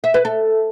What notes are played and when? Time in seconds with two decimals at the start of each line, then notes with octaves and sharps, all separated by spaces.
0.04 E5
0.14 B4
0.25 A4